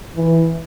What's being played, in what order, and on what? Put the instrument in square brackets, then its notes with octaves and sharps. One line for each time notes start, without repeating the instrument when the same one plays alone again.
[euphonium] E3